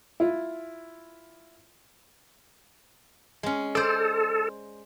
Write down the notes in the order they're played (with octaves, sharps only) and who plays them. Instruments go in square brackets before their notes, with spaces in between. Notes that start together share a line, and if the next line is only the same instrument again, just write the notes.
[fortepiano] E4 F4
[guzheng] G#3 C#4
[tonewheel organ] A4 [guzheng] C5 D5